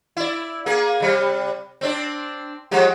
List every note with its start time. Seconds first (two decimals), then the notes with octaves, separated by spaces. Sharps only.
0.17 E4 D5
0.66 A#3 G#4
1.00 C3 G3
1.81 C4 D4 D5
2.71 F3 G#3 G4